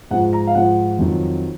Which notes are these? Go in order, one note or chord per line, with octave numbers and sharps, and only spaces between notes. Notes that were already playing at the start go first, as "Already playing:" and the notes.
G#2 F3 F#5
A#5
F5
G#2 F3 F#5
F2 D#3 F#3